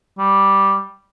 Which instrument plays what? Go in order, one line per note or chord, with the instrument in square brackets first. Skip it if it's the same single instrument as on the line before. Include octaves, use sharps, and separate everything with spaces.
[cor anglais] G3